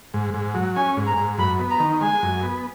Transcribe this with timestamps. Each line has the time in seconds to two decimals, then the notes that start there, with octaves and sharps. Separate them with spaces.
0.14 G#2
0.34 G#2
0.54 F#3
0.76 C#4 G#5
0.97 G#2
1.07 A#5
1.17 G#2
1.38 F#2 B5
1.59 B3
1.70 A#5
1.80 D#3
2.01 G#3 G#5
2.23 F#2
2.43 B3